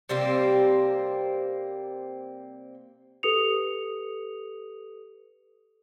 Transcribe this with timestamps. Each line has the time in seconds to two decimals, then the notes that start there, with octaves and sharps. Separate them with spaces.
0.09 C3 G3 A#3 C4
3.23 G4 A4 B4 D#6 C#7 F7